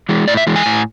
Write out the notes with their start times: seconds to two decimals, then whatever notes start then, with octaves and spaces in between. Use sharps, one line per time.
0.09 E3 G#3
0.28 A2 D5
0.37 E5
0.47 E3 G#3
0.56 G#5
0.66 A2